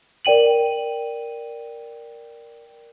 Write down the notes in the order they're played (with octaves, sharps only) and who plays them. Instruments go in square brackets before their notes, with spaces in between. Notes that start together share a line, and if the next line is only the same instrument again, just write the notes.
[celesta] A#4 D5 G5 D#7 F#7